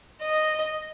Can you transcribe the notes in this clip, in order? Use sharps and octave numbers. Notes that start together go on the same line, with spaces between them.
D#5